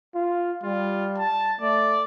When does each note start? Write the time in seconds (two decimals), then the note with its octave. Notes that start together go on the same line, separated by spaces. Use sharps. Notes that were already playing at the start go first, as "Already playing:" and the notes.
0.15 F4
0.63 G3 F4
1.18 A5
1.61 A3 D5